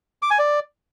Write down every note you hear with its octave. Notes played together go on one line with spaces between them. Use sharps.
D6
G#5
D5